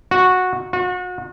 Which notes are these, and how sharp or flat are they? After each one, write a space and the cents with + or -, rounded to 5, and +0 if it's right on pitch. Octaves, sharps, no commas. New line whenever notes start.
F#4 -10
F#4 -35